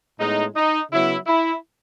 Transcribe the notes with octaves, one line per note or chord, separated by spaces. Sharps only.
A2 G#3 B3 D#4
D#4
C#3 F#3 B3 E4
E4